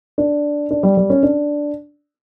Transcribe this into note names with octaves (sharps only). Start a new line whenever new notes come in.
D4
D4
G3
G3
C#4
D4